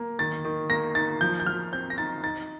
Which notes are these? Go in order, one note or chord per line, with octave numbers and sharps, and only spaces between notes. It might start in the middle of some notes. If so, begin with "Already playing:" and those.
Already playing: A#3
D#3 A6
D#3
A#3 A#6
D#4 A6
F3 G6
G6
F3 F6
C4 G6
A#6
D#4 A6
D#4 A6